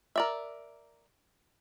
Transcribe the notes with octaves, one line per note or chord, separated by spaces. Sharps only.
A#4 D5 E5